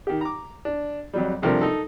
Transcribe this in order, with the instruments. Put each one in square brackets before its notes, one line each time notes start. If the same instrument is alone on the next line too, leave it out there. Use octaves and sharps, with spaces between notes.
[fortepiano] D#3 G4
A#5 D6
D4
F2 F#3 G3
G2 C3 F3 A3 D4 A#4
D#4 A4